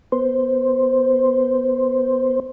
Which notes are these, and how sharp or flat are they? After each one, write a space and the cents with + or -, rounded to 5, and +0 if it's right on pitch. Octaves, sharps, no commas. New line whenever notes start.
B3 +0 C5 +0